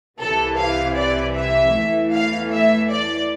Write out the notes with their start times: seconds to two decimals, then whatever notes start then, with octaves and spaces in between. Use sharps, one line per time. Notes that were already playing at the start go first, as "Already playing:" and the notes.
0.20 C2 C3 E3 A4
0.59 F5
0.98 D5
1.36 E5
1.75 E2 E3 A3
2.13 F5
2.52 E5
2.91 D5